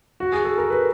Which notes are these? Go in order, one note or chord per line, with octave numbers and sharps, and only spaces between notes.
F#4
G#4
A4
A#4
B4